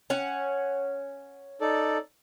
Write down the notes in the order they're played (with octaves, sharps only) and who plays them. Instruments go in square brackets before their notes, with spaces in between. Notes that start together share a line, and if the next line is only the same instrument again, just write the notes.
[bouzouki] C#4 F#5
[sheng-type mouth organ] D#4 A4 D5